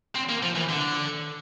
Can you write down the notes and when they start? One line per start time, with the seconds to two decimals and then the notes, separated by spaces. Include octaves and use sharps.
0.15 C4
0.29 A#3
0.43 F3
0.56 E3
0.69 D3